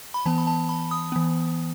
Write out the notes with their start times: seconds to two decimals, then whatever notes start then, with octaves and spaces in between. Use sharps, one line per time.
0.14 B5
0.26 E3 B3 A5
0.38 B5
0.47 A5
0.69 B5
0.91 D#6
1.12 E3 B3